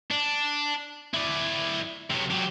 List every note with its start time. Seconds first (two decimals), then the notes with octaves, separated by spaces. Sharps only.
0.11 D4
1.14 E4 D5
2.10 C3 F#3
2.31 F#3 G4